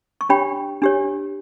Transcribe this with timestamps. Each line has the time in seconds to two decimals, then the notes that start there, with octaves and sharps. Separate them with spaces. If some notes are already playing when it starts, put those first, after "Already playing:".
0.21 C#6
0.29 D4 G4 C#5 G5 B5
0.82 D4 G4 C#5